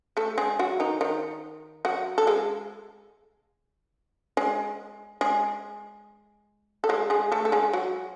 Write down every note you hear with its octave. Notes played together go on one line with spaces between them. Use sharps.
A3 A4
G#3 G#4
F#3 F#4
D#3 D#4
D#3 D#4
F#3 F#4
A4
G#3 G#4
G#3 G#4
G#3 G#4
A4
G#3 G#4
G#3 G#4
A3 A4
A4
G#3 G#4
F#3 F#4